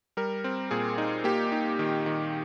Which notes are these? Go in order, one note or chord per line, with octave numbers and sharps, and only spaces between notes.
G3 A#4
C4
A#2 G#4
D#4
A#3 G4
D#4
D#3
D#3